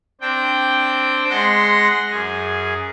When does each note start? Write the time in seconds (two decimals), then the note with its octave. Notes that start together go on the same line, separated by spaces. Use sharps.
0.21 C4 D4 G5
1.30 G#3 F#5 C6 A#6
2.10 F#2 G#4